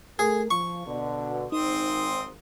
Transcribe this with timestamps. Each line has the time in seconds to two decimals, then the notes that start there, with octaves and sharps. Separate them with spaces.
0.19 A3 G#4 A#4
0.51 F3 C#6
0.86 B2 D3
1.52 G#1 G#2 C4 D#4 C6 D#6